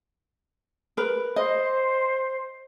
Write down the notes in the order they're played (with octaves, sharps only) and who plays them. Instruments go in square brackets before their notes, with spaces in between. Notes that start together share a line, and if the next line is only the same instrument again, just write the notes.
[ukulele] A#4 B4
[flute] C5 [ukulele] D#5